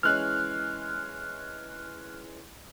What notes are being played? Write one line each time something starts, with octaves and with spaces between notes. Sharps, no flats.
E3 G#3 C#4 F6 F#6